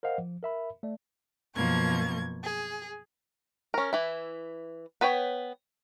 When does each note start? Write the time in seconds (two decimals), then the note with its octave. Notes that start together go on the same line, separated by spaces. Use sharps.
0.03 A#4 C5 D#5 F5 F#5
0.18 F3
0.43 A#4 E5 B5
0.83 A3 D5
1.55 F#2 B2 F3 A#3 C#6 G#6
2.43 G#4
3.74 C#4 A#4
3.93 E3 E4
5.01 B3 B4 C#5 G5